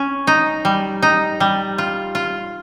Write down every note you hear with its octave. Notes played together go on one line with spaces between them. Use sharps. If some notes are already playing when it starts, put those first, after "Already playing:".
Already playing: C#4
D#4
G3
D#4
G3
F4
F4